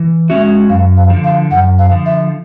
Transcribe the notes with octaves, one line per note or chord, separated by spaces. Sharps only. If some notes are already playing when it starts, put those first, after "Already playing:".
Already playing: E3
G#3 C#4 F#4 E5
F#2 F5
F5
D3 F3
F5
F#2 F#5
F5
D3 F3
E5